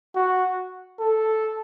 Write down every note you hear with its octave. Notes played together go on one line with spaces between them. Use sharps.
F#4
A4